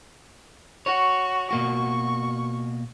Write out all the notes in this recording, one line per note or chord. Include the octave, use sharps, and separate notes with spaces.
F#4 C#5
B2 A#3 F#4 C#6